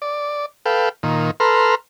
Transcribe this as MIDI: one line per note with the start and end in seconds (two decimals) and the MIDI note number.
0.02 0.46 74
0.66 0.89 69
0.66 0.89 71
0.66 0.89 77
0.66 0.89 79
1.03 1.31 46
1.03 1.31 51
1.40 1.75 69
1.40 1.75 71
1.40 1.75 82
1.40 1.75 84
1.40 1.75 89